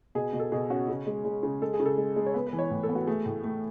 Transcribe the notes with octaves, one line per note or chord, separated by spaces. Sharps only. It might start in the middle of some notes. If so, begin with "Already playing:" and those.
B2 G#4
B2
A4
B2 G#4
C#4 F#4
C#3
G#3
G#3
C#3
G#3 A4
G#4
C#3
A4
G#3
G#3
C#5
B3 B4
B4
E3
C#5
A2
A4
B3
F#4
A3 G#4
A2
A3